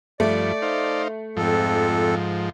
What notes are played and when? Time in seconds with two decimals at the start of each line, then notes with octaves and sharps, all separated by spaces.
0.20 G2 F3 A3 D5
0.62 D#4 C5 F5
1.37 F2 G#2 F3 A4